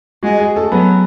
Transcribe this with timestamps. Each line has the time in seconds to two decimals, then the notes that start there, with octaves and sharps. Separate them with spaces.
0.23 G#3 F#4
0.40 G#4
0.56 A3 A4
0.72 F#3 B3 B4